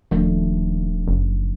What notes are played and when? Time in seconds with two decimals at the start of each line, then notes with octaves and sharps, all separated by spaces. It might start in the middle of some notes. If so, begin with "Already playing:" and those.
0.11 D#1 D#2 F3 A3 D4
1.07 F#1